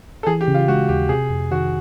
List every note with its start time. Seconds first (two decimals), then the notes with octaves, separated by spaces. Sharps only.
0.23 A4
0.27 E3 G#4
0.41 G4
0.48 C#3
0.54 F4
0.68 G#3 F#4
0.89 D#2 G4
1.09 C3 G#4
1.30 F2
1.51 D#3 F#4